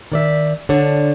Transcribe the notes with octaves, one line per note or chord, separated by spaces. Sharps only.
D#3 D5 E5
D3 D4 C#5